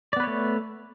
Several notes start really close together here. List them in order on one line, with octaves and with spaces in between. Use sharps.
D5 B3 B4 C#5 A3